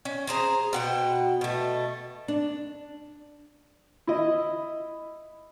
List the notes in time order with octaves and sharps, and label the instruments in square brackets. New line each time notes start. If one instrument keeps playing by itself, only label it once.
[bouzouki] C#4
G#4 C5 A#5
B2 F#5 G5
B2 A3
[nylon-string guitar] D4
[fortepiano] E4 D#5